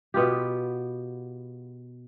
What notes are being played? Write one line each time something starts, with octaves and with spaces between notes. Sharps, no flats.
B2 B3 F4 G4